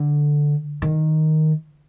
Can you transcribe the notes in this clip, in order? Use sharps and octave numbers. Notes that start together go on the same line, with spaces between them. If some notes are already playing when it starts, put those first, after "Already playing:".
Already playing: D3
D#3